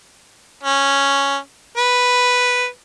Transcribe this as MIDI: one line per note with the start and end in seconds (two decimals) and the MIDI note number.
0.64 1.37 61
1.77 2.66 71